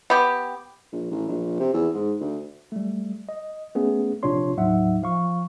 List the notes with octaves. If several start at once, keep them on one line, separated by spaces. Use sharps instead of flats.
B3 G4
A#1
A1
A#1
C3
E2
G#2
D2
G3 A3
D#5
A3 B3 C#4 G#4
A#1 C3 D4 F4 C#5 C6
D#2 A2 F#3 D#4 E5 F#5
F3 F5 C#6